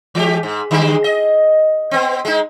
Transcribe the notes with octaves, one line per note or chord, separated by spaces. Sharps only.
E3 G#3 G4
G#2
D3 G3 G#3
D#5
B3 C4
G#3 D#4